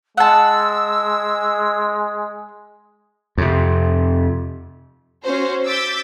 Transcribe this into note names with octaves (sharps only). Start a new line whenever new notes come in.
G#3 F#5 A5 E6
F2 C3
C#4 F#4 C5 C#5
D6 E6 G6 A6 B6